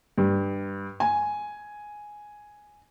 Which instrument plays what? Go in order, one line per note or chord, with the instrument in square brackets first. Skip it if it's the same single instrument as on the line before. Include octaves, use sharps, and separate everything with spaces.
[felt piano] G2
G#5